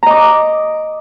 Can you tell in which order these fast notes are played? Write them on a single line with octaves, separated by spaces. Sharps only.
A#5 D#5 D6